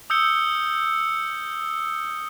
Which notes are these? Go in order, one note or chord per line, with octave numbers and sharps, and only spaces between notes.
D#6 E6 G6 C#7 G7